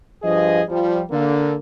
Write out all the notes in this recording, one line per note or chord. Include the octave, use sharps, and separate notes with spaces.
G2 F3 G#4 D#5
F3 G3
D3 A#3